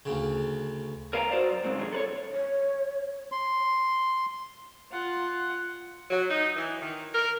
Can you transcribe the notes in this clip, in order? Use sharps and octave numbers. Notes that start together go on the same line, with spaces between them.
D2 C#3
A#4 B4 F5 G5 G#5 A#5
F#4 C5 D5
F#2
G#2 C#3 G#3 C4
B2 D3 D#3 F#3 G#4
A4 B4 C#5
C#5
C6
F4 F#5
F#3
D#4
E3
D#3
A#4